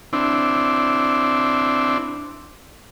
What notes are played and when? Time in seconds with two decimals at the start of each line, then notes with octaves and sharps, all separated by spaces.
0.13 C4 D4 E4